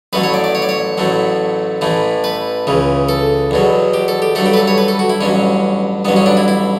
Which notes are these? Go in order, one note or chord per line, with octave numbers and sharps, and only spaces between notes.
A1 A2 F#3 A3 B4
C#5
D5
D5
C#5
D5
C#5
A1 A2 F#3 A3
A1 A2 E3 A3
B4
C#2 C#3 E3
A4
E2 B2 F#3
G4
A4
G4
G2 F#3 A3 A4
G4
B4
A4
C#5
B4
A4
F#4
E4
A1 G2 F#3 C#4
A1 G2 F#3 B3
C#4
D4
E4
E4